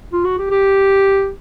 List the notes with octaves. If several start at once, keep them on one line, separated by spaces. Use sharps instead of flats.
F4
F#4
G4
G4